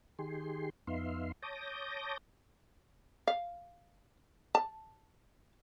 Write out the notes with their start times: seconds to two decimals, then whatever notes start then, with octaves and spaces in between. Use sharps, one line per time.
0.19 D#3 G4 G#4 C6
0.87 F2 B3 D#4 E5 F5 C6
1.42 C#5 A5 D6 D#6 G6 A#6
3.28 F5
4.55 A5